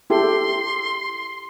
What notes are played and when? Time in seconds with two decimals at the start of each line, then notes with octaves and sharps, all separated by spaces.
0.10 E4 G4 A4 C6